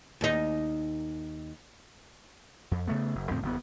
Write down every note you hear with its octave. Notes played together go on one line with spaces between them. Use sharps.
D#2 D#4
F2
C#3 A3 B3
F#1
F2 A2 C#3 C4
F#1 E2 B2 B3